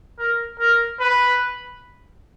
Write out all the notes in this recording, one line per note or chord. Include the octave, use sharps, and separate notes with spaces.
A#4
A#4
B4